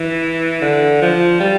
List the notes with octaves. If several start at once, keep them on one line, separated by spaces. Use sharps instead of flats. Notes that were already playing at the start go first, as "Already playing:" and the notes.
Already playing: E3
D3
F3
G3